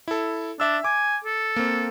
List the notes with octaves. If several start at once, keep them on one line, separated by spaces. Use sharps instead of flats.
E4 A4
D4 E5 E6
G#5 D6
A4
A#3 C4